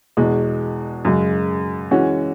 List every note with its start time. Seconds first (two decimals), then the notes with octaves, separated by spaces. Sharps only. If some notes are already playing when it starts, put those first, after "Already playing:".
0.17 E2 B2 G#3
1.05 F#2 C#3 G#3
1.91 E3 G#3 C#4 F#4